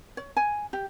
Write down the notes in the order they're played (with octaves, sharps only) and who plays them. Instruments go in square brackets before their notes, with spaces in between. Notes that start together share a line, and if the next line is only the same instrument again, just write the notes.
[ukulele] C#5
G#5
G4